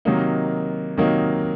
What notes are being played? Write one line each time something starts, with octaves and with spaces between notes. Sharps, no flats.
C3 D#3 F#3 A#3 D#4
C3 D#3 F#3 A#3 D#4